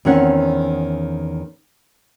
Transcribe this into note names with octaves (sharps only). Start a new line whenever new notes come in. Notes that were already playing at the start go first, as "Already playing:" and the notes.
E2 D#3 C4 C#4 F#5